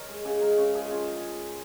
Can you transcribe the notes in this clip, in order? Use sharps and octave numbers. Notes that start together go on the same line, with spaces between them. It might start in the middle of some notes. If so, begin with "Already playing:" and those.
Already playing: A#4 C#5 D#5
G#3
C#3 G#4
G#3 A#4
C#3 C#5
F3 G#4
C#3 F4